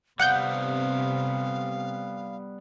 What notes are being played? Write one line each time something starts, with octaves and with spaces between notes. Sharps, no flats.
C3 G3 B3 F5 F#5 F#6 G6